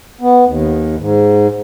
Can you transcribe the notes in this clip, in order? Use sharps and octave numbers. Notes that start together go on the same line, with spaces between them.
B3
D#2
G#2